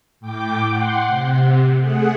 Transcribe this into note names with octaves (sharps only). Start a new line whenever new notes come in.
A2 G5 D6
F#5 C6
C3
A3 G#4 F#5